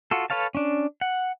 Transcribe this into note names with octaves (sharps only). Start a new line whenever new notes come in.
F4 F#4 A4
A4 B4 C#5 F5 A5
C#4 D4
F#5